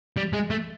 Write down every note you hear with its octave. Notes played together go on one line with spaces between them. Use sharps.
G3
G#3
A3